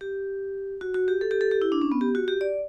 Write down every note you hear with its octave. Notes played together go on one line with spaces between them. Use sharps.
G4
F#4
F#4
G4
A4
G4
A4
G4
E4
D4
C#4
B3
G4
F#4
G4
D5